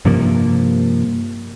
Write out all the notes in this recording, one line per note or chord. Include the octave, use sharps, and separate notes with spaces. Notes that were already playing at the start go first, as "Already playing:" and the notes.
G2 C3 F3 A#3